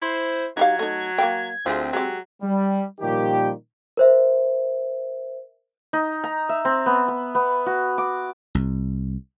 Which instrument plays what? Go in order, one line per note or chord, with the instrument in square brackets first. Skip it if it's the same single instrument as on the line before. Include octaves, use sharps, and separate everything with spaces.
[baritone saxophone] E4 [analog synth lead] C5
[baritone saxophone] F#3 [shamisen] D#4 G4 F5 [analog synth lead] G#6
[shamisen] A3 D#4
A#3 F5 G5
[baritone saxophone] D2 [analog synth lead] C4 [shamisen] F4 G#4
[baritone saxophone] F#3 [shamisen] G#3 G4
[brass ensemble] G3
A#2 D#3 F3 G3 G4
[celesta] A#4 C5 E5
[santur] D#4
A#5
E5
C4
B3
B5
B3
F#4
D6
[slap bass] C2